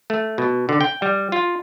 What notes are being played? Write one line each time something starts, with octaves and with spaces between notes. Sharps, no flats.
A3
B2
D3
G5
G3
F4